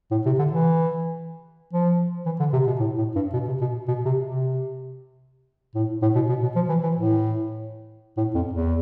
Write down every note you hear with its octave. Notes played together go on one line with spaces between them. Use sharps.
A2
C3
D3
E3
F3
E3
D3
C3
B2
A2
A2
G2
B2
C3
B2
B2
C3
C3
A2
A2
B2
B2
B2
F3
E3
E3
A2
A2
F2
E2